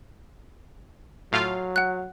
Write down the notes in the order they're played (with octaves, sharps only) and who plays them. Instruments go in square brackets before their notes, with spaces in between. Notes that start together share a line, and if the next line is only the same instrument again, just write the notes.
[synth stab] A2 F4 F5 [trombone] F#3
[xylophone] F#5 F#6